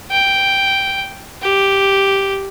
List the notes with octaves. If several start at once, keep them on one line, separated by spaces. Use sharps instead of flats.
G5
G4